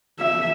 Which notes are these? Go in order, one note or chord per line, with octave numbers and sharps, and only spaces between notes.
E5